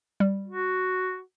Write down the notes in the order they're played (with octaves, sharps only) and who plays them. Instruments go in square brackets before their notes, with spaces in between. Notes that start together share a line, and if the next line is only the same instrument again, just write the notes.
[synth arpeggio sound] G3
[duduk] F#4